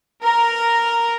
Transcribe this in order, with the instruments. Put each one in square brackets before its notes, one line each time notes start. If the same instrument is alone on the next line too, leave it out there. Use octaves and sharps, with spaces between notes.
[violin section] A#4